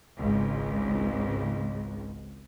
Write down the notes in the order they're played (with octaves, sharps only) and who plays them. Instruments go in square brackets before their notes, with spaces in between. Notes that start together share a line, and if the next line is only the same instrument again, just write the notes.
[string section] G#1 C#2